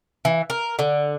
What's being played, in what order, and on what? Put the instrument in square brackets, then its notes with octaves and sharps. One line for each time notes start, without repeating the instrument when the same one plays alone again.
[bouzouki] E3
A#4
D3